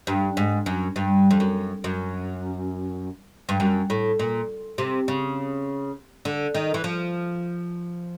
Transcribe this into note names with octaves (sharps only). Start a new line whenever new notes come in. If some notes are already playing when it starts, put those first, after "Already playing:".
G2
G#2
F#2
G2
F2
F#2
F#2
G2
F#2
A2
A#2
C3
C#3
D3
D#3
E3
F3